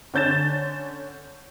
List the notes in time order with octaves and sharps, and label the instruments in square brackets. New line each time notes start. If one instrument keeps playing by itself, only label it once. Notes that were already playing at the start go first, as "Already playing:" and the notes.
[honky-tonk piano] D3 C#4 G6 A6 E7